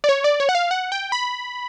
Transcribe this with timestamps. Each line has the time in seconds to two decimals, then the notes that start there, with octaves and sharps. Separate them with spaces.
0.04 D5
0.09 C#5
0.24 D5
0.40 C#5
0.49 F#5
0.55 F5
0.71 F#5
0.92 G5
1.12 B5